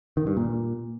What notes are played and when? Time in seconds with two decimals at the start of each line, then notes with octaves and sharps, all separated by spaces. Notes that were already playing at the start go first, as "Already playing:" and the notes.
0.17 D#3
0.27 G2
0.37 A#2